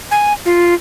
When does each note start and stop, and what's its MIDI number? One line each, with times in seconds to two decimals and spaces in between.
0.11 0.33 80
0.45 0.74 65